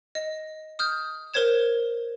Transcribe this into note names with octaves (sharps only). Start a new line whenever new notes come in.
D#5
D#6 F6 G6
A#4 C5 C#5 G#6 E7